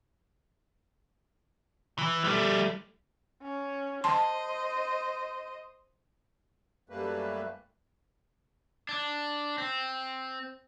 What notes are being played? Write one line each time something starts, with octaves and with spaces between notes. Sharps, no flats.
E3
G3 A3
C#4
C5 D#5 A5 C6
F#2 G3 A3 A#3 B4
D4
C4